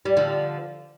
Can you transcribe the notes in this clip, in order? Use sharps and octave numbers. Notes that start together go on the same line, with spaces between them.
G3
D3 F3